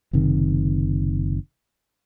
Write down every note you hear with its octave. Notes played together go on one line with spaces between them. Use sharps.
F#1 C3 D#3